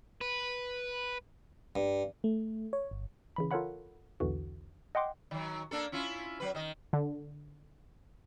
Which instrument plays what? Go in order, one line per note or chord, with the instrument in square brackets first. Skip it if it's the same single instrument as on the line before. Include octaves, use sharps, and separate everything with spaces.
[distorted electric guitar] B4
[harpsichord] G2
[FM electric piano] A3
C#5
G1
[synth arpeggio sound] C#3 E3 B5
F4 A4 A#4 C#5 F#5 B5
B1 E2 D3 E3 F#4
D#5 F#5 G5 C6 D6
[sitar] D#3 F#3
A#3 D4 A4
C#4 E4 F4
F#3 B4
D#3 D#5
[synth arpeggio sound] D3